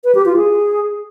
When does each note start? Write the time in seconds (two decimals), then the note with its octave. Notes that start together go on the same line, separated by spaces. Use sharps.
0.04 B4
0.15 G4
0.26 F4
0.36 G#4